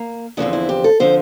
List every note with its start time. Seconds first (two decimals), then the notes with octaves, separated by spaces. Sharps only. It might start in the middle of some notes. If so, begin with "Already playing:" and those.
Already playing: A#3
0.37 E2 D3 F3 C4 E4
0.53 E4
0.69 G4
0.84 A4
1.00 D3 F3 C4 C5